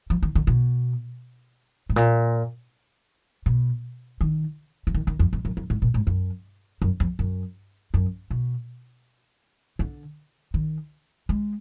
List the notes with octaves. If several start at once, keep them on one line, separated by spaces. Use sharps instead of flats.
F3
D#3
D3
B2
G#2
A#2
B2
D#3
F3
D#3
D#3
F2
F2
F#2
F#2
G#2
A#2
G#2
F#2
F#2
F2
F#2
F#2
B2
D3
D#3
G#3